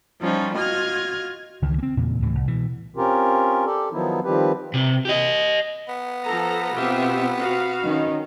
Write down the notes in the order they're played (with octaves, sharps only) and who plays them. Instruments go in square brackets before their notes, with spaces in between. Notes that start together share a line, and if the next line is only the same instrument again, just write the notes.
[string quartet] F3 G3 C#4 D#4 F4
F4 F#4 D#5 F6 G#6
[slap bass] C#2 D#3 E3
A#3 C4
E2 A#2 C#3
D#2 A2 E3
C2
B2 E3
[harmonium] C4 C#4 F4 G4 A#4
G4 A4 D5
D#3 F3 F#3 B3 D#4 E4
D#3 F3 G3 C4 G4 B4
[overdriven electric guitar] C3
G4 D#5
[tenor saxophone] B3
[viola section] F3 A4 A#5
[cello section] B2 C4 [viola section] F4 G4 E5
[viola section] F#4 F5
[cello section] D#3 C#4 D#4